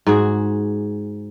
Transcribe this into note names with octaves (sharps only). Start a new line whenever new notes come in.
G#2 F#4 G#4